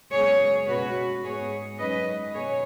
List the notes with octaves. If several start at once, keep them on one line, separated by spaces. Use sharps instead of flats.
F#2 C#3 G#3 B3 G#4 C#5
B2 G#3 C#4 F#4 B4
G#2 G#3 B3 G#4 C#5
F#2 D#3 G#3 C#4 B4 D#5
B2 G#4 C#5